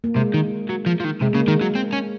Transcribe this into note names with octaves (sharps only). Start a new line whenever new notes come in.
A#3
C3 G#3
D#3
F#3
F3
F3
D#3
C3 G#3
C#3 A#3
D#3 G#3
F#3
C4
C#4